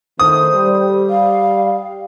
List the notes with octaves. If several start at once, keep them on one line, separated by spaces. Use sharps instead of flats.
D#3 A3 C5 D#6
G3
F5